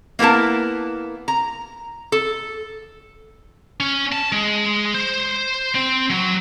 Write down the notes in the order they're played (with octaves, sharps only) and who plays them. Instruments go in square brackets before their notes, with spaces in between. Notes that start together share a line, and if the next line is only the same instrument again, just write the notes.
[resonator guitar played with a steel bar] A#3 B3 E4 A#4 A5
A#5
A4
[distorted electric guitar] C#4
A5
G#3
C5
C4
F#3